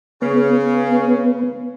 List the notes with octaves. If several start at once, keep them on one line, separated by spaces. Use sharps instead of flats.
C#3 B3